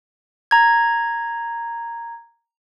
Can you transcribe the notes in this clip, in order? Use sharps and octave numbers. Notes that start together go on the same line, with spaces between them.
A#5 G#6